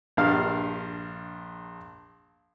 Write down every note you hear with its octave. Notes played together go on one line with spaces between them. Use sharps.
A#1 G2 F5 F6